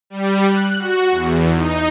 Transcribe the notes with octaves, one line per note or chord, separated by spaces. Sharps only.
G3
F#6
F#4
E2
D#4